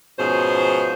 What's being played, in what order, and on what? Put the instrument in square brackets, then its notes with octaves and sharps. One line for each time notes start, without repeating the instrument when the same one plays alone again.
[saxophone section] G#2 B2 F3 C#4 G#4 C5